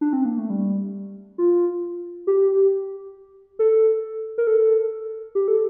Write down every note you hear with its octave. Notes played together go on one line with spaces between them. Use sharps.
D4
C4
A#3
A3
G3
F4
G4
A4
A#4
A4
G4
A4